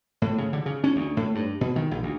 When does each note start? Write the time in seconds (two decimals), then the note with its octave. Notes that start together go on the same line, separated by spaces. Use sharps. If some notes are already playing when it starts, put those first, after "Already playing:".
0.22 A2
0.38 C#3
0.53 D3
0.66 C#3
0.84 C#4
0.96 D2
1.17 A2
1.35 G2
1.61 B2
1.76 D#3
1.91 A#1
2.03 D2